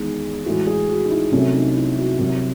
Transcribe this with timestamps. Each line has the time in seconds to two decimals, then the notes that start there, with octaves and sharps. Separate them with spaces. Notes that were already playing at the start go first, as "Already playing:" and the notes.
Already playing: E2 D#3 G#3 G#4
0.45 A2 E3 G#3 F#4
0.67 G#4
0.89 F#4
1.05 D#4
1.10 E4
1.32 C2 C3 F#3 A3 C#4
1.54 D#4
1.76 E4
1.98 F#4
2.19 C2 C3 F#3 F#4